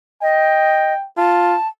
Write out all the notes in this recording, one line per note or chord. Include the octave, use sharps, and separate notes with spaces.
D#5 G5
F4 A5